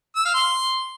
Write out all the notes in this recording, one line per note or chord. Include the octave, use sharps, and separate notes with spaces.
E6
F5
C6